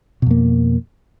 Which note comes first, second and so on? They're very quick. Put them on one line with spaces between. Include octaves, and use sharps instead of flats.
B2 F2 A#3